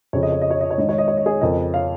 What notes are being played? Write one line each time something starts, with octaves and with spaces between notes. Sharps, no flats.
F2 C#3 F3 C#5
D#5
C#5
D#5
C#5
D#5
C#5
G#2 D#3 D#5
C#5
D#5
C#5
D#5
G#4 C#5
F2 C#3 F3 A#4 D#5
C#5 F5